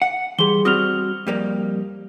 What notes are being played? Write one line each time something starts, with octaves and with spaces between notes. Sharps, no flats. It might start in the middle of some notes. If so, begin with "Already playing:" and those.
F#5
E3 G3 G#4 C6 G7
G3 C4 F#4 D#6 F6 F7
F2 G3 A#3